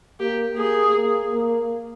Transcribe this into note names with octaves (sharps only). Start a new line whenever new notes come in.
A#3 G4
A#3 G#4
A#3
A#3